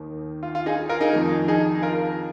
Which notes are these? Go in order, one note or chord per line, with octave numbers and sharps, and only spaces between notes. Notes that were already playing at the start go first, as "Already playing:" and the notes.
Already playing: D#2 D#3
F4
F4
D#4 G#4
F4 A#4
D#4 G#4
F2 D#3
D#4 G#4
F4 A#4